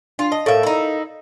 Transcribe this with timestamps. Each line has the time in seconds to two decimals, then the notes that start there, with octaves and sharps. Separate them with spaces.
0.19 D4 F4
0.32 D#5 A5
0.46 A2 A4 A#4 E5 F5
0.63 D#4 E4